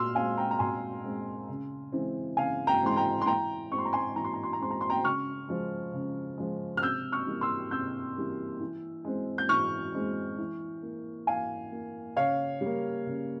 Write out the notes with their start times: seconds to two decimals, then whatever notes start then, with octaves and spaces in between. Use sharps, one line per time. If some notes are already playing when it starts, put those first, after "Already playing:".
Already playing: A#2 C6 E6 F6
0.15 G#3 C4 F5 G#5
0.37 G5 A#5
0.51 A#5
0.59 A#2 G#5 C6
1.04 G#3 C4
1.49 C#3
1.92 E3 G#3 C4
2.37 C#3 F5 G#5
2.67 G5 A#5
2.83 E3 G#3 C4 C6
2.96 G5 A#5
3.22 C6
3.26 E3 G5 A#5
3.70 G#3 C4 C#6
3.78 C6
3.85 A#5
3.93 G#5 C6
4.16 E3 A#5
4.25 C6
4.34 A#5
4.43 C6
4.53 A#5
4.60 G#3 C4 C6
4.71 A#5
4.81 C6
4.90 G5 A#5
5.04 C#3 C#6 F6
5.49 F3 G#3
5.93 C#3
6.38 F3 G#3
6.77 F6
6.83 C3 E6 G6
7.12 C#6 F6
7.27 E3 G3 A#3
7.41 C6 E6
7.71 C3 E6 G6
8.16 E3 G3 A#3
8.60 E3
9.05 G#3 C4
9.38 G6
9.49 E3 C#6 F6
9.95 G#3 C4
10.38 E3
10.83 A#3
11.27 E3 F5 G#5
11.72 A#3
12.16 C#3 C#5 F5
12.61 G3
12.66 A#3
13.06 C#3